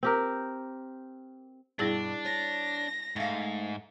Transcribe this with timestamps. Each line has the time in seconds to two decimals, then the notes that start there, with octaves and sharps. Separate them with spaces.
0.03 C4 G4 A#4
1.79 G2 B2 G3 D4 E4 G#4
2.25 C#5 A#6
3.16 G#2 A3 F5